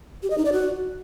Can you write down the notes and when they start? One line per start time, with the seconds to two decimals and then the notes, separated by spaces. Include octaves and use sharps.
0.23 G4
0.30 D#5
0.38 D#4
0.45 D5
0.53 F#4